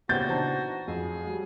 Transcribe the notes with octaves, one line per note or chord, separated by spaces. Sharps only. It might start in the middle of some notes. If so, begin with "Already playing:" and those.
A#2 C#3 B3 F#4 G4 C5 G6 A6
E3 D4 D#4 C5 A5 A#5
F2 F#3 G#4
F#3 G3